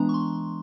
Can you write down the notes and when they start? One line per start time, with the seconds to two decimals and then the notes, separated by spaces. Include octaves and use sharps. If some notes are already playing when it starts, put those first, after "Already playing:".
Already playing: E3 G#3 B3 D4 A#5
0.09 C#6
0.14 C6